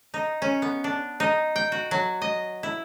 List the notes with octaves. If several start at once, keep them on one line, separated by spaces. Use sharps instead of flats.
D#4
C#4
B3
D4
D#4
G5
F#4
F#3
D#5
E4